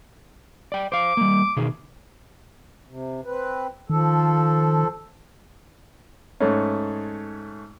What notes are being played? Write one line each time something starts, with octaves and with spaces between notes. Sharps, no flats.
D5 G5
C5 F5 D6
G3 A#3
B2 D#3 G#4
C3
C4 B4
D#3 F3 A4
G#2 A3 C#4